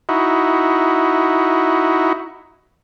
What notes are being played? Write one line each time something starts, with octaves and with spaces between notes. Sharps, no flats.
D#4 E4 F#4